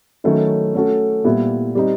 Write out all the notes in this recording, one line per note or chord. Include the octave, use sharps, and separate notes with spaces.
D#3 F#3 A3 C#4 E4
A3 C#4 F#4 A4
A#2 G3 B3 E4
G3 C4 D#4